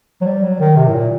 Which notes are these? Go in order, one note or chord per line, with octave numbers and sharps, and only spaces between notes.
F#3
G3
F#3
D#3
C3
A2
A#2